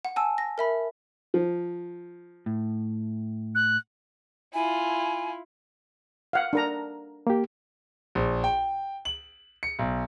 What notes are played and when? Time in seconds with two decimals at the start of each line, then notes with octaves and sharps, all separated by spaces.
0.05 F#5
0.16 G#5 A5 E6
0.38 A#6
0.58 A#4 E5 B5
1.34 F3
2.46 A2
3.55 F#6
4.54 E4 F4 G#5
6.33 F5 F#5
6.53 D4 A#4 A#5
7.27 A#3 G4
8.15 A#1
8.44 G5
9.05 F#7
9.63 C#7
9.79 B1